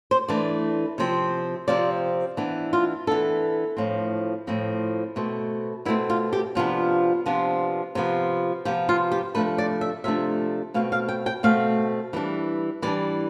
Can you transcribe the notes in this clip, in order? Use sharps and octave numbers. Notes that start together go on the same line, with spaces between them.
C5
E3 A3 D4 D5
C3 F3 C4
C3 F3 C4 D5
E3 B3 D4
F4
E3 B3 D4 A4
A2 F3 C4
A2 F3 C4
B2 A3 C4
B2 A3 C4 E4
F4
G4
C3 F3 B3 D4 F4
C3 F3 B3 D4
C3 F3 B3
C3 F3 B3 G4
F4
G4
C3 F3 A3 D4 B4
D5
E5
C3 F3 A3 D4 E5
B2 A3 C4 F5
F5
G5
G5
B2 A3 C4 F5
E3 G3 D4
E3 G3 D4 D5